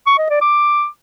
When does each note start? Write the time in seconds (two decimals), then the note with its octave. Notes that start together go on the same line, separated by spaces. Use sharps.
0.07 C#6
0.18 D#5
0.30 D5
0.41 D6